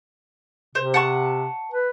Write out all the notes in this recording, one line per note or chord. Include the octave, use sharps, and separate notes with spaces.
C3 C5
F#5 A5 C#6
B4